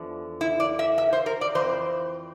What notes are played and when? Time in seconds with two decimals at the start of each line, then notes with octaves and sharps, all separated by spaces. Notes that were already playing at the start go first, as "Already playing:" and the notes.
Already playing: E2 D3 F3
0.41 E4
0.60 D5
0.79 E5
0.98 E5
1.13 C5
1.26 A#4
1.41 D5
1.55 F2 E3 C5